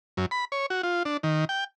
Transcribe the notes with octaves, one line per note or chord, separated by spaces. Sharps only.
F#2
B5
C#5
F#4
F4
D4
D#3
G5